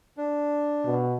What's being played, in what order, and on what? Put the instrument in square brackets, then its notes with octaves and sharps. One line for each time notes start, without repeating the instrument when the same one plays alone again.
[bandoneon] D4
[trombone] B2